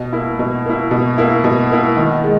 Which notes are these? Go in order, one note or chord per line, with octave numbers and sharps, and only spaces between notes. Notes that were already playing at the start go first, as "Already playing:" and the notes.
Already playing: B2
A#3 E4
B2
A#3 E4
B2
A#3 E4
B2
A#3 E4
D#3
G#3